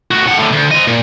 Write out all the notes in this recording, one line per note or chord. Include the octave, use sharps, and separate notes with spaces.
A2 F#4
A2 F#5
A2 D3
D2
C4 D#5
A#2